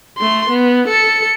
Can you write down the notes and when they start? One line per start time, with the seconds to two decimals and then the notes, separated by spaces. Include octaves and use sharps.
0.19 A3 C6
0.50 B3
0.88 A4 C#7